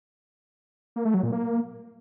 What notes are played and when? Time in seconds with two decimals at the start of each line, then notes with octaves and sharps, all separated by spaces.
0.96 A#3
1.05 A3
1.14 F#3
1.23 A#2
1.32 A#3